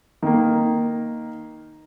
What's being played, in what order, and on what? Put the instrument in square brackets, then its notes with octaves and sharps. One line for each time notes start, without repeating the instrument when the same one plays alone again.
[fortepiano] D#3 A#3